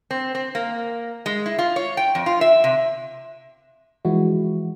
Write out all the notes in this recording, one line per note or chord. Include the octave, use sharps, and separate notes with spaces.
C4
C4
A#3
G#3
E4
F4
C#5
G5
F2
F4
E5
C3
E3 F3 G#3 E4 F#4